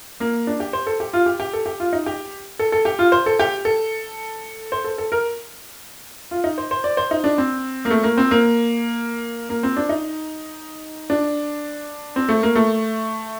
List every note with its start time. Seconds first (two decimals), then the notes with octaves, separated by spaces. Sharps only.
0.20 A#3
0.47 D4
0.60 G4
0.73 C5
0.87 A4
1.00 G4
1.13 F4
1.26 G4
1.40 G4
1.53 A4
1.66 G4
1.80 F4
1.93 D#4
2.06 G4
2.59 A4
2.72 A4
2.85 G4
2.99 F4
3.12 C5
3.26 A4
3.39 G4
3.65 A4
4.72 C5
4.84 A4
4.98 A4
5.12 A#4
6.31 F4
6.44 D#4
6.58 C5
6.71 C5
6.84 D5
6.97 C5
7.11 D#4
7.24 D4
7.38 C4
7.85 A#3
7.90 A3
8.03 A#3
8.17 C4
8.31 A#3
9.49 A#3
9.63 C4
9.77 D4
9.89 D#4
11.10 D4
12.16 C4
12.29 A3
12.43 A#3
12.55 A3